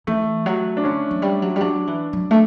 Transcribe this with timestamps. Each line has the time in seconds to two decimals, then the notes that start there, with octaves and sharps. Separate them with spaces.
0.07 E3 A3
0.46 F#3
0.77 D4
0.84 D3 C#4
1.11 F#3
1.22 G3
1.42 F#3
1.56 G3
1.60 F#3 D4
1.87 E3
2.13 F#3
2.31 A3